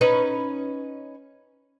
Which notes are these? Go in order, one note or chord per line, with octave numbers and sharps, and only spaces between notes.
C#4 D#4 B4